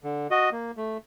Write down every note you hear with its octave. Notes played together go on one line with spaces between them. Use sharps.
D3
F#4 D#5
A#3
A3